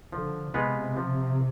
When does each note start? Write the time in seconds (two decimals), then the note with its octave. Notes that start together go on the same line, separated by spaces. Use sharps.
0.12 D3 F3
0.54 C3 G#3 B3 F4 B4
0.96 F3